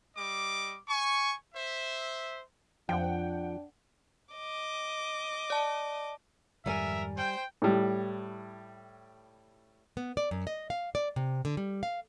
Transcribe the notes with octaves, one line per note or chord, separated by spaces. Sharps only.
G3 D#5 D6
G#5 C#6
C5 E5
F2 F3 D4 F#5 G5
D#5 D6
D5 A5
F2 G#2 D#3 G3 A#4 E5 G#5
C5 G5
A2 G3
B3
D5
F#2
D#5
F5
D5
C3
D3
G3
F5